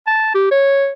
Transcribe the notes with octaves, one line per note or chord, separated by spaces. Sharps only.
A5
G4
C#5